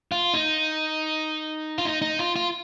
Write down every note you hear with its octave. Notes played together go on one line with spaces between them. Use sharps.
F4
D#4
F4
D#4
D#4
F4
F4